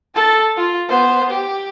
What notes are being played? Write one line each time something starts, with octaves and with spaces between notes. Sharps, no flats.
A4 A5
F4
B3 C5
G4